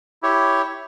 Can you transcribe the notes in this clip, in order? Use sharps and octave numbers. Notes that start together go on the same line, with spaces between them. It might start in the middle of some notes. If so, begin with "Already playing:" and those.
E4 G4 C#5